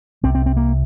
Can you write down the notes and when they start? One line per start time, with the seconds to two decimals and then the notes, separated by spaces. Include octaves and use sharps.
0.23 C2 C3 C4
0.35 C4
0.46 C4
0.57 A#3